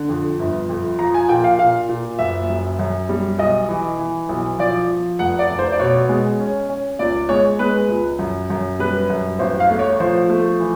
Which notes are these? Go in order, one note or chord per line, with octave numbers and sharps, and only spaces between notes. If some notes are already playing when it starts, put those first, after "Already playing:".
Already playing: D3
F2
G1
F2
F3 A#5
G#5
A#2 G5
F5
A#2 F5
A#2
F#1 E5
F#2
F#2
G3
B1 D#5
E3
E3
B1
F3 D5
F3
F1 F#5
D5
F1
C5
D5
B2 C#5
G#3
C#4
C#4
C#2 D5
G#3 C#5
G#3 B4
C#2
F#2
F#2
G3 B4
F#2
A1 C5
F5
A3
C#5
F3 C5
A3
E3